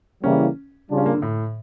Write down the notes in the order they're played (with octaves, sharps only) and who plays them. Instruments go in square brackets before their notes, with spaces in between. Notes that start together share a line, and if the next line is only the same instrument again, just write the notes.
[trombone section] C#3 E3 G3 A#3 E4 [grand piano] C#4
[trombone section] C#3 G3 D4 F4
[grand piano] C#4
A#3
D3
A2